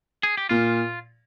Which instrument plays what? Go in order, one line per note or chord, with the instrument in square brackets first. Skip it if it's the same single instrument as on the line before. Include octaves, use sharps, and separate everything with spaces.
[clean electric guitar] G#4
G4
[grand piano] A#2 [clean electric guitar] F4